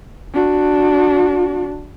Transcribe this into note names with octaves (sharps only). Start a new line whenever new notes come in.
D4 F#4